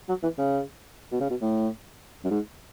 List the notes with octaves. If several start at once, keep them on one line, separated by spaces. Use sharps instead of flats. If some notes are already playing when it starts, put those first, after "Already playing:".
F#3
E3
C#3
B2
C#3
B2
A2
F#2
G#2